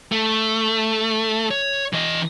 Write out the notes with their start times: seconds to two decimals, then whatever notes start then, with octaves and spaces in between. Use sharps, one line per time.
0.12 A3
1.51 C#5
1.93 E3 D#5